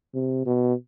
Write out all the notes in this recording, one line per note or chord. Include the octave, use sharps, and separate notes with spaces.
C3
B2